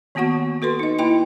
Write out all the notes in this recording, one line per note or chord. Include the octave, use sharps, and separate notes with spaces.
D#3 A#3 B3 F#4 F#5 C#6
F#4 A4 B4 C6
D#4 D#5
A#3 E4 D#5 G5 B5 C6